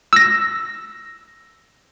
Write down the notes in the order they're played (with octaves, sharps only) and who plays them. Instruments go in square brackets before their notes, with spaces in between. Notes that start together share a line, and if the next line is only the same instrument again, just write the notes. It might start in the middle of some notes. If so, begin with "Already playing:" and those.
[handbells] E6 A#6